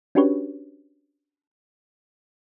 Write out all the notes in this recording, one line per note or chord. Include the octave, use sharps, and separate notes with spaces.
C#4 D4 F#4 G4 B4 C#5